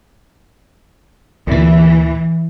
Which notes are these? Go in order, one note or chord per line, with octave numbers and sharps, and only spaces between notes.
D2 A#2 E3